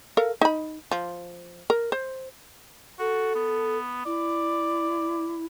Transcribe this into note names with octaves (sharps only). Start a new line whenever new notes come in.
A4 A#4 F5
D#4 B5
F3
A#4
C5
F#4 A4
B3
E4 D5